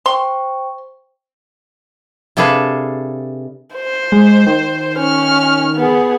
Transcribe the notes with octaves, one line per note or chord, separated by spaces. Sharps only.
C5 G5 C6 C#6
C3 D4 G#4 A4 B4 F5
C5
G#3
D#3
C#4 F6
B3 G#4